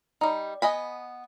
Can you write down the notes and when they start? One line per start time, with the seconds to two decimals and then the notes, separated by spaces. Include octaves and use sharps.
0.21 G3 D#4
0.62 B3 D#5 G#5 B5